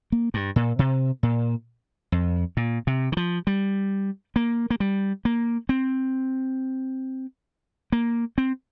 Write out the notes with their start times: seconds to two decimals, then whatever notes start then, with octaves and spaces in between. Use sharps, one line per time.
0.12 A#3
0.34 G2
0.56 A#2
0.79 C3
1.23 A#2
2.12 F2
2.57 A#2
2.87 C3
3.12 D#3
3.17 F3
3.47 G3
4.36 A#3
4.70 A#3
4.80 G3
5.25 A#3
5.69 C4
7.92 A#3
8.38 C4